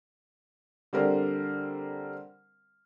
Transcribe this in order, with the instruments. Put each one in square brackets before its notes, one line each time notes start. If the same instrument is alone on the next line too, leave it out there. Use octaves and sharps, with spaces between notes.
[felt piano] D3 G3 C4 A#4 C5